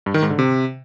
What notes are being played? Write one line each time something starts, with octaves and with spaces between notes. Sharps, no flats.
G2
D#3
G#2
D3
C3